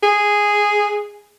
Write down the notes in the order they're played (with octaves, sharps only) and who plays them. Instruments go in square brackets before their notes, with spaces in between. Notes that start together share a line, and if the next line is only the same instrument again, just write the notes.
[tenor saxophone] G#4